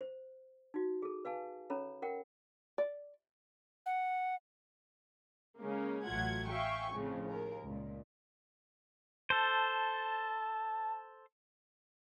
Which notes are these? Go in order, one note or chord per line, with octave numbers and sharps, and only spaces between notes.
C5
D#4 F#4
G#4 A4
B4 F5 G#5 A5
C#4 A4 C#5 A#5 B5
A#4 F#5 G5
D5
F#5
C#3 G#3 A#3 C#4
A1 F#3 A3 F4 F#5 G#6
E5 F5 G5 G#5 C#6
F2 A2 C#3 F3
D#2 A#4
C#2 A#2
A4 C5 A5